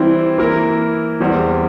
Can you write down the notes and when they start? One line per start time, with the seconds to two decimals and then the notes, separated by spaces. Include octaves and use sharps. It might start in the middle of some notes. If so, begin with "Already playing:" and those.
Already playing: E3 G3 C4 E4
0.38 E3 A#3 E4 A#4
1.20 E2 E3 G3 C4